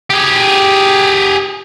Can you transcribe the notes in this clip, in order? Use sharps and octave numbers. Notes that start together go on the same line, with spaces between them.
G4 G#4